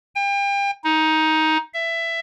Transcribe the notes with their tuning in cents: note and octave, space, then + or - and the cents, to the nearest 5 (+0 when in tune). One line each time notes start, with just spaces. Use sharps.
G5 +35
D#4 +15
E5 +15